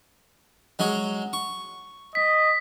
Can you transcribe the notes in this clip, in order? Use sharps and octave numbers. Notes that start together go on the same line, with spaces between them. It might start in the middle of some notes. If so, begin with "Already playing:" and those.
F#3 G#3 C#5
C#6
D#5 B6